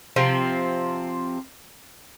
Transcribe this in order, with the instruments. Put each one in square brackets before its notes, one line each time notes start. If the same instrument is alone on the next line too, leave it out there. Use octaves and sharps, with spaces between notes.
[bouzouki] C3 F3 C4